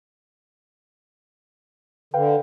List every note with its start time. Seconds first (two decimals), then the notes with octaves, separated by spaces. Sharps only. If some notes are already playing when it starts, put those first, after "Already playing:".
2.14 D3 B4 F5 G5